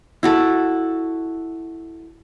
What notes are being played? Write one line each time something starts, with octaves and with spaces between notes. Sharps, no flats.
E4 F#4 A4